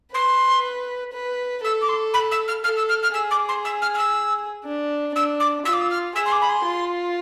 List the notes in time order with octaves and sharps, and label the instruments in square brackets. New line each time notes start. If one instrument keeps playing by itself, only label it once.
[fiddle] B4 [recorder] C6
[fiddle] B4
[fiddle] A4 [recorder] E6
[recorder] D6
C6
B5
E6
F6
[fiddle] A4 [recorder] F6
[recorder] E6
F6
F6
[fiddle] G#4 [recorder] E6
[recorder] D6
C6
E6
F6
F6
E6
[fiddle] D4
[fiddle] D4 [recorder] E6
[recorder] D6
[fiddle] F4 [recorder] E6
[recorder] D6
E6
F6
[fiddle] G#4 [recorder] E6
[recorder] C6
D6
B5
C6
[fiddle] F4